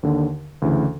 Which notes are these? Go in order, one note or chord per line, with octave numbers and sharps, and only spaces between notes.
D#2 D3
D2 C#3 E3